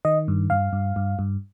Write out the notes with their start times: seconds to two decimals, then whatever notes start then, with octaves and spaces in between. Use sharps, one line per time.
0.05 D#3 D#5
0.28 G2
0.50 G2 F5
0.73 G2
0.96 G2
1.19 G2